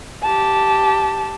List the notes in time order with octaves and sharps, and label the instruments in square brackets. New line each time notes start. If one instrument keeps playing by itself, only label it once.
[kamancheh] G4 A5